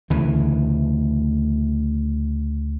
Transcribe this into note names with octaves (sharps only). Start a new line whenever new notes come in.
D2 C#3 E3